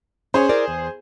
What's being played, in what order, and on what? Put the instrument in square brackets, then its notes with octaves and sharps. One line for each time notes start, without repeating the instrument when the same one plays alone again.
[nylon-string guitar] C#4 C#5 [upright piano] G#4 C5
[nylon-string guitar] E4 A#4 D5
E2